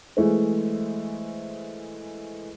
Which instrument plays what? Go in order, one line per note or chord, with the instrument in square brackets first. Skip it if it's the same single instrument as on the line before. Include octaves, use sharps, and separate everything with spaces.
[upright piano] E3 G#3 A3 E4 G#4 C5